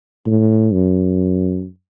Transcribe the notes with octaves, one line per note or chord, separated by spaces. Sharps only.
A2
F#2